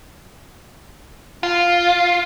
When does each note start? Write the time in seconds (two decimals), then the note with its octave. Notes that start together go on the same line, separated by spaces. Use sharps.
1.43 F4